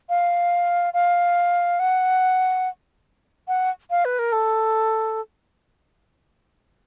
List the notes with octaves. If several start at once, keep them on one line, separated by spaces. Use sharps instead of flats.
F5
F5
F#5
F#5
F5
B4
A#4
A4